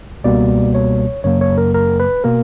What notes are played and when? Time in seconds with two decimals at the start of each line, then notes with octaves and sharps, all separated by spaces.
0.24 C#2 B2 G3 A#3 D5
0.75 C#5
1.24 F#2 C#3 F#3 A#3 C#5
1.41 C#5
1.58 A#4
1.74 A#4
2.00 B4
2.24 B2 A#3 A#4